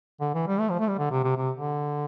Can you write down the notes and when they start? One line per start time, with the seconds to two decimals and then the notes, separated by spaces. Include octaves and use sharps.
0.21 D3
0.35 E3
0.47 G3
0.60 A3
0.69 F3
0.80 A3
0.88 G3
0.99 D3
1.11 C3
1.24 C3
1.37 C3
1.56 D3